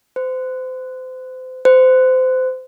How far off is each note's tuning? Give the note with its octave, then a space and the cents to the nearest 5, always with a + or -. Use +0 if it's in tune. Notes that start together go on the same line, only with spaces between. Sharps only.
C5 -30
C5 -25